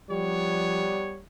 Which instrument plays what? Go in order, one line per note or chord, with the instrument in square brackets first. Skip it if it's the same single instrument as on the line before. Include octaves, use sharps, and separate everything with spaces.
[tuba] F3 [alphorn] G3 [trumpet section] B3 D4 C#5